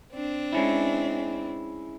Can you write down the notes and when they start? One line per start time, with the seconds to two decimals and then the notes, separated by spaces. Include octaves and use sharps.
0.13 C4 D4
0.53 G#3 C#4 E4